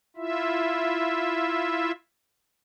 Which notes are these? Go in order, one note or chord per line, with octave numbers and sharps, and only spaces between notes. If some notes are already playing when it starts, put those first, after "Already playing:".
E4 F4 E5